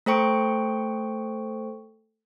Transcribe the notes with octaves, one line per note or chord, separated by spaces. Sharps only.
A3 A4 C5 G5 C#6 D7